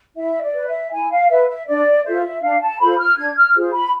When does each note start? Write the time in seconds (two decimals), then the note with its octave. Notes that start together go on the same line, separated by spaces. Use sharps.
0.17 E4 E5
0.42 D5
0.54 B4
0.67 E5
0.92 E4 G#5
1.10 F5
1.29 B4 E5
1.48 E5
1.67 D4 D5
2.05 F4 A4 C5 E5
2.43 D4 F5
2.61 A5
2.80 F4 A4 C5 B5
2.98 F6
3.17 D4 G#6
3.36 F6
3.55 F4 G#4 C5
3.74 B5